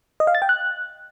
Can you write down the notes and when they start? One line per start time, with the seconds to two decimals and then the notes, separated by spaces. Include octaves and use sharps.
0.20 D#5
0.27 F5
0.35 A6
0.42 G5
0.49 F#6